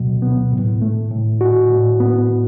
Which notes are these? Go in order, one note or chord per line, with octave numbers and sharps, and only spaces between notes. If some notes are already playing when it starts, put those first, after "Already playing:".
Already playing: D2 B2 F#3
B3
A2
A3
A2
F#4
A2
B3